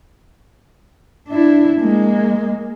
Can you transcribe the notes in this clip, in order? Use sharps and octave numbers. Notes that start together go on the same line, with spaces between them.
D4 E4
G#3 A#3